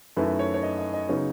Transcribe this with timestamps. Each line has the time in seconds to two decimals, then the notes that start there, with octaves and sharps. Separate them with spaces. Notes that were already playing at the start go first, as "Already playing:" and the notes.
0.17 F#2 D#3 A3 C#4 E4 B4
0.39 C#5
0.54 C#5
0.63 D#5
0.78 D#5
0.94 D#5
1.09 C#3 F#3 B3 D#4 C#5